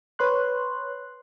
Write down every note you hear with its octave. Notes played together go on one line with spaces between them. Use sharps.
B4 C#5 C6 F#6